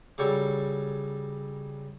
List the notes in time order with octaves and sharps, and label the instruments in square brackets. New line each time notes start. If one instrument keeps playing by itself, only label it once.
[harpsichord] C#3 F#3 G3 A4 C#5